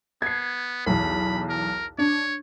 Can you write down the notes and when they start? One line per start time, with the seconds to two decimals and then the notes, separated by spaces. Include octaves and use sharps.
0.22 B3 G#6 C7
0.87 B1 E2 B5
1.49 A#4
1.98 D4 C#5